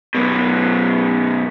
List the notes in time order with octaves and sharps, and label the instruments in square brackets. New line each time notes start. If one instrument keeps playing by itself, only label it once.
[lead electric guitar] F#2 B2